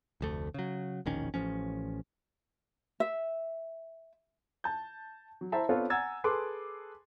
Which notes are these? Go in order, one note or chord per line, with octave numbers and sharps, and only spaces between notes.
F1 D2 A3
C#3 F#3
E1 A#1 D#3 C#4
A1 F3 C#4
E5
A5 G6
F#3
E4 C5 E5 A5 A#5
B3 C4 D4 F4 A4 C#5
F#5 G#5 A#5 E6 G#6 A6
G#4 A4 B4 C6 D6